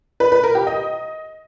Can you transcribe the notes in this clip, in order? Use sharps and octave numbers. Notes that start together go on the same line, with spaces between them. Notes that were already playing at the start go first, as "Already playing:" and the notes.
B4
B4
A#4
G4
D#5